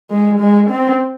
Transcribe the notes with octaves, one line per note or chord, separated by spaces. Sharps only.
G#3
G#3
C4